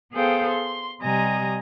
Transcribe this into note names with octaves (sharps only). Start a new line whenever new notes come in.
B3 G#4 A4 C5 F5 G5
C6
C3 G3 D#5 G#5 A#5